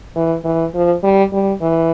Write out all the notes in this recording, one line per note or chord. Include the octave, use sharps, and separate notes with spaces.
E3
E3
F3
G3
G3
E3